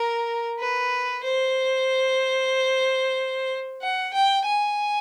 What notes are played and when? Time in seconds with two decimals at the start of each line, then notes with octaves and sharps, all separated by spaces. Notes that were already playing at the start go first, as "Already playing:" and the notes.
Already playing: A#4
0.59 B4
1.23 C5
3.82 F#5
4.14 G5
4.46 G#5